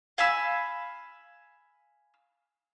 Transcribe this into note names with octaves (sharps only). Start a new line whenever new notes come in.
F5 G#5 B5 E6